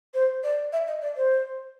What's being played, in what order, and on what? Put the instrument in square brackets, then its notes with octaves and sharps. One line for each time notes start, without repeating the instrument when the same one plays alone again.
[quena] C5
D5
E5
D#5
D5
C5